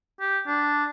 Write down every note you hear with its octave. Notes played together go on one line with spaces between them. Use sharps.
G4
D4